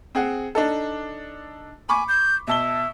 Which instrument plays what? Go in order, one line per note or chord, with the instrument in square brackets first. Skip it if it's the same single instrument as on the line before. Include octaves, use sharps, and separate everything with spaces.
[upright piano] C4 G#4 F#5
D4 D#4 A4
[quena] G#5 [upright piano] B5 C#6 D6
[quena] G6
[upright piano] B2 A5 G7 [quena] E5